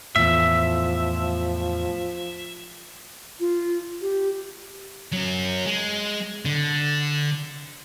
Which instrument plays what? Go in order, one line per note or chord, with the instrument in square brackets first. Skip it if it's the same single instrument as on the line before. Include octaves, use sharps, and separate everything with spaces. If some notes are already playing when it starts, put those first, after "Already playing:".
[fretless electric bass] E2 A2 [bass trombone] F3 [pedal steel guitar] E5
[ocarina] F4
G4
[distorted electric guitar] F#3 C#4
G#3
D3